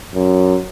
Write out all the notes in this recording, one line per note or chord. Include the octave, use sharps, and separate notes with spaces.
F#2